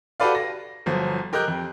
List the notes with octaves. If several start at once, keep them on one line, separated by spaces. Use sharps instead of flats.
F#4 G4 A4 B4 D5 F5
A#6
G1 F3 F#3
G4 A#4 D#5 F#6 G6
F2